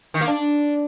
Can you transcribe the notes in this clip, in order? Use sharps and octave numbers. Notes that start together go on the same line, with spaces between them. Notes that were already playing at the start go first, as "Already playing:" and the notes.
D#3
A#3
D4